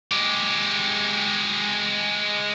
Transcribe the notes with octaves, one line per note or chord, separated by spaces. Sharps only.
G#3 G4